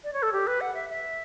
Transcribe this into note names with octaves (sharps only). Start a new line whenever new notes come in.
D5
C#5
A4
G4
B4
F#5
E5
E5